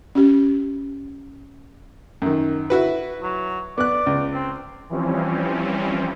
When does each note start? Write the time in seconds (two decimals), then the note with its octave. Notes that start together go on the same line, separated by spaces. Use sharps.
0.15 C#4 G4
2.22 F#2 D#3
2.70 E4 F#4 B4
3.23 F#3
3.78 B3 D5 F#6
4.06 C#2
4.33 C4
4.89 E3 F3 G3 C4 C#4